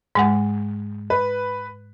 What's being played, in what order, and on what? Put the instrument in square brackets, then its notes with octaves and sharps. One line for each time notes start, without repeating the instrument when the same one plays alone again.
[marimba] G#2 G#3 F#5
[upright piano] B4